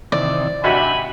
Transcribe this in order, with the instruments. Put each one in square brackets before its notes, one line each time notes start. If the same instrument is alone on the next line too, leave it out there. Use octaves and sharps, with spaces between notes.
[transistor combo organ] C3 D#3 E3 [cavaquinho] D5
[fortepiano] G#1 C3 F#4 [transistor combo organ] D4 E5 G5 [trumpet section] G#5 B5